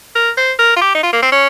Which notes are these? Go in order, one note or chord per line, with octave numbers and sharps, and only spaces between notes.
A#4
C5
A#4
F4
G4
D#4
F4
A#3
C4
C#4